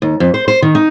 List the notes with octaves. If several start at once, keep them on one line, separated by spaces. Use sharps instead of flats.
D#2
F2
C5
C5
D#3
D#4